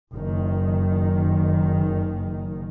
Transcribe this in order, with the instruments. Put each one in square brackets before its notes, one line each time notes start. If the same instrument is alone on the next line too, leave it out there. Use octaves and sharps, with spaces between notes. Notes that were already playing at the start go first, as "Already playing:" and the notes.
[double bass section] F#1 D#3